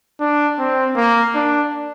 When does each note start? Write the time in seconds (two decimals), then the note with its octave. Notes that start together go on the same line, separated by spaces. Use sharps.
0.21 D4
0.59 C4
0.97 A#3
1.35 D4